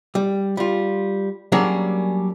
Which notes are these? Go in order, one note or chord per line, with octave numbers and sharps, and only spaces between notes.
G3
G3 F4
F#3 G3 A#3 C#4 D4 G#4